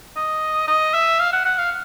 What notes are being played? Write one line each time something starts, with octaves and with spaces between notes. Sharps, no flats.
D#5
D#5
E5
F5
F#5
F#5
F5